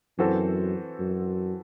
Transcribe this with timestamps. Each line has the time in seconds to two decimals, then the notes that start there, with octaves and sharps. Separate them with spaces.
0.18 F#2 E3 C4 F#4 A4 C5
0.99 F#2